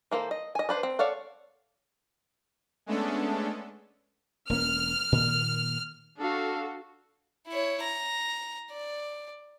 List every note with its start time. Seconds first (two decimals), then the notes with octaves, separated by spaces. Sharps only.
0.11 E3 A#3 A4 C5
0.31 D#5
0.55 D#5 G#5
0.69 D4 B4 C5
0.83 C4
0.99 A4 C#5 D5 F5 F#5
2.86 G#3 A3 B3 C#4 D4 A4
4.49 E1 A#3 C#4 F6
5.12 A#2 D#3 A#3
6.18 D4 F#4 A4 F5
7.48 E4 C#5
7.82 A#5
8.71 D5